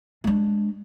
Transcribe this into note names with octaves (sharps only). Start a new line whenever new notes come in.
G#3 D4